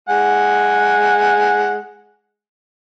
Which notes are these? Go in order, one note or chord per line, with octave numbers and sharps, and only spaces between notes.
G#3 F#5 G#5